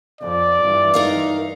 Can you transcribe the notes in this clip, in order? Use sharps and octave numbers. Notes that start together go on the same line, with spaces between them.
F2 D5
G2 E3
D#4 A#4 F5